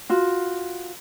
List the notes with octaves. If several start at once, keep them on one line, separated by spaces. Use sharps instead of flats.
F4 F#4